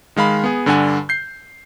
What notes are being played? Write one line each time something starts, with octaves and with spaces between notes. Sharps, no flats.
D#3 G#3 F5 B5
B3 G#4
G2 D3 D4 F#5 G#5
G6 C7